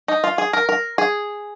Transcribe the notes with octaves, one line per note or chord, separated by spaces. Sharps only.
D#4
F4
G#4
A#4
A#4
G#4